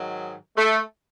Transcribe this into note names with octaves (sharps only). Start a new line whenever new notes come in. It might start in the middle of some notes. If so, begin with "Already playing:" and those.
Already playing: G#2 D#3 F#3
A3